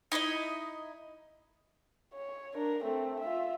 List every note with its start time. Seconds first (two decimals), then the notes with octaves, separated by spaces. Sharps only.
0.12 D#4 E4 C5 D#5
2.15 C#5
2.54 D4 A#4
2.84 A3 C4
3.20 F4 E5